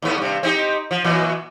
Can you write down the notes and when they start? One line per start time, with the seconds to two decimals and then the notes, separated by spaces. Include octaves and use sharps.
0.02 D#2 A2 B3
0.18 G2 C3
0.43 C4 D#4 G4
0.91 F3
1.04 A#2 E3 F#3